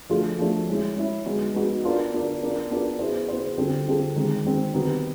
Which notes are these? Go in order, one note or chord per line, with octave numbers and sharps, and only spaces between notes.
F3 A3 D4 F4 A4
F3 A3 D4 F4 A4
G#3 C#4 E4
G#3 C#4 E4
G#3 B3 D#4 F#4
G#3 B3 D#4 F#4
B3 D4 F4 A#4 D5
B3 D4 F4 A#4 D5
B3 D4 F4 A#4 D5
B3 D4 F4 A#4 D5
B3 E4 G#4 C5
B3 E4 G#4 C5
D3 G3 C4 F4 A4
D3 G3 C4 F4 A4
D#3 G#3 C4
D#3 G#3 C4
C3 D#3 G3 B3